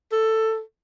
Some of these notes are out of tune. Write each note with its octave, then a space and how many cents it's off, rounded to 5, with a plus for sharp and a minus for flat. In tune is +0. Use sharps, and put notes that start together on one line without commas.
A4 +10